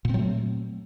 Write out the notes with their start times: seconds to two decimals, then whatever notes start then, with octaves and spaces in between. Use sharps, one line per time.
0.05 A#2
0.09 C4
0.14 F#3
0.19 A3